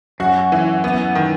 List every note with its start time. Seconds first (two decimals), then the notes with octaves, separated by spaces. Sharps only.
0.20 F#2 F#4
0.52 E3
0.84 B3
1.15 D#3